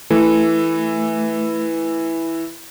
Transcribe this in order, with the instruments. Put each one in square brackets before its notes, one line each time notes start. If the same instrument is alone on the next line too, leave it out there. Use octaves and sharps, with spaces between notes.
[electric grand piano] E3 [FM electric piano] A3